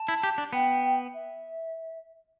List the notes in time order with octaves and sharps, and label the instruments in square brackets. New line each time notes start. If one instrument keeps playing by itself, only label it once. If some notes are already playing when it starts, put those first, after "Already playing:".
Already playing: [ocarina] A5
[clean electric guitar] E4
G4
D4
[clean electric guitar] B3 [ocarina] G5
[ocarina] E5